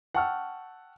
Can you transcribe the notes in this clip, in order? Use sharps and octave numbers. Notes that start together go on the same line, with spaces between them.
F#5 G5 A5 C#6 E6 F6